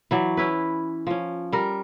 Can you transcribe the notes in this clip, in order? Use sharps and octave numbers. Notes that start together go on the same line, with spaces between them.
E3 F#3 D5
C#4 E4 B4
F3 C#4
G3 A#4